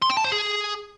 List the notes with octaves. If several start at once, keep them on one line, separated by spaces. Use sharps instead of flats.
C6
G5
A5
C5
G#4